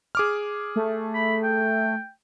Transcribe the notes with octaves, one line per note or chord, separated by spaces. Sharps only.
G#4 D6 F6
A3
B5
G5